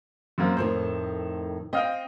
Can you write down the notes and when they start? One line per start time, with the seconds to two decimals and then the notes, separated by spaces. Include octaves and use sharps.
0.38 F#2 A#3 C4
0.57 F2 A2 D#3 C5
1.73 C4 D#5 F5 G5